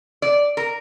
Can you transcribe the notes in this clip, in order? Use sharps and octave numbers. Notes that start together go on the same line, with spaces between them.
D5
A#4